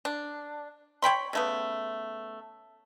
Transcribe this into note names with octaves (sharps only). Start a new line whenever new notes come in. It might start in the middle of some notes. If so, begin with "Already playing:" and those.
D4
C#5 G5 B5 C6
C#3 A3 B3